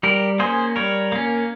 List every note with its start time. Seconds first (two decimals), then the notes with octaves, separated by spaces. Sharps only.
0.03 G3 G4 A#4
0.39 A#3 C#4 G#4 C5
0.76 G3 A#4 C#5
1.12 A#3 C#4